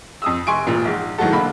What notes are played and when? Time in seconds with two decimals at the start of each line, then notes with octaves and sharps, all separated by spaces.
0.22 F2 D#6 E6
0.47 F1 G#5 C6 C#6 D7
0.67 E1 A#2
0.85 A#1 G#2
1.18 D#3 E3 F#3 G#3 F#4 A4
1.32 E1 D3 A#3 B5